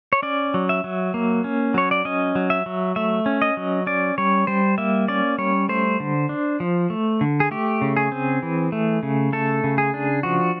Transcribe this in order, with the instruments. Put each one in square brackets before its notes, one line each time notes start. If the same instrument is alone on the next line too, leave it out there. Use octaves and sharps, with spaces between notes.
[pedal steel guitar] C#5
C#4 D5
F#3
E5
F#3
A#3
C#4
F#3 C#5
D5
C#4 D#5
F#3
E5
F#3
A3 E5
C#4
D#5
F#3
C#4 D5
G3 C#5
G3 C5
A#3 E5
C#4 D5
G3 C#5
A3 C5
D3
D4
F3
A3
D3
G#4
A3 G4
C#3
G#4
C4
E3
A3
C#3
A3 A4
C#3
G#4
D4
F3 F#4